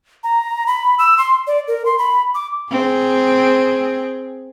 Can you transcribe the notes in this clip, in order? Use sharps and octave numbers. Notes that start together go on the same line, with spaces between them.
A#5
B5
E6
C6
D5
A#4
C6
B5
D6
C4 G#4